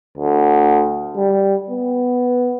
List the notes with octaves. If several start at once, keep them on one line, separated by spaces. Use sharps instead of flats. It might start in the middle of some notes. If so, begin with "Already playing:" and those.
D2
G3
B3